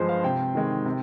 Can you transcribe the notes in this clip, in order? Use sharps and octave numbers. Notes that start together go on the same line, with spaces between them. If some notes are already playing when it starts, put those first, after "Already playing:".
Already playing: G2 F3 G#3 G#4 C5
F5
C3 G5
D#3 G#3
C3